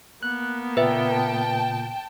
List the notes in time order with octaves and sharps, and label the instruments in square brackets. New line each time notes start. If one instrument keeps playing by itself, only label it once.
[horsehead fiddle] A#3 B3 [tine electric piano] F#6
[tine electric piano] A#2 C#3 [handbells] B4 E5 [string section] G5 A5